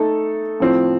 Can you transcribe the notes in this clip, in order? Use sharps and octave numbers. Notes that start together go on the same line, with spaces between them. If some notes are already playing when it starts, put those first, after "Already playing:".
Already playing: A3 D#4 A4
A2 F3 C4